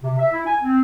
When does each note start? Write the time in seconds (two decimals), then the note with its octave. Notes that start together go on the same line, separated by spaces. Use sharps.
0.03 C3
0.19 E5
0.32 E4
0.47 G#5
0.63 C4